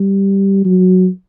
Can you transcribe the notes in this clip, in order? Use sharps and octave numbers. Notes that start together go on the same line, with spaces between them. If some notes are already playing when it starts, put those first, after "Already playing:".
Already playing: G3
F#3